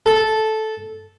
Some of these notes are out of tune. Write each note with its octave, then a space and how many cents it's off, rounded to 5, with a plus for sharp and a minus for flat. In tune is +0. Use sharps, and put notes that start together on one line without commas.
A4 -10